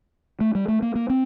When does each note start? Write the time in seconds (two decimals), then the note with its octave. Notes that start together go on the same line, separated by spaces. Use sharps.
0.41 A3
0.55 G3
0.68 A3
0.82 A#3
0.95 A#3
1.10 C4